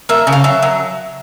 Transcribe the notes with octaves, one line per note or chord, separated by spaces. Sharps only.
A#3 E5
C#3
F5
F#3 E5
F#3